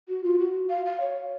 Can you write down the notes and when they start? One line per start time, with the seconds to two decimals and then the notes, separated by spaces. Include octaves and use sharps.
0.08 F#4
0.24 F4
0.39 F#4
0.70 F5
0.86 F5
1.01 C#5